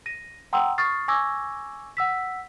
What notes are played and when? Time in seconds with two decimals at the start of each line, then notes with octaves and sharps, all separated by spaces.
0.06 A#6 D#7
0.53 F#5 G5 A#5 C6 D#6 E6
0.78 C#6 D#6 F6 A6 C7
1.08 G#5 C#6 D6 E6 G#6 A#6
1.97 F#5 E6 B6